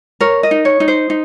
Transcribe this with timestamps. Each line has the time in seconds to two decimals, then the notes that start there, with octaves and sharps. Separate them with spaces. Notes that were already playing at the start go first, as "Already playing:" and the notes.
0.21 A#4 C#5
0.43 D#5
0.51 D#4
0.65 C#5
0.80 D#4
0.88 C5
1.10 D#4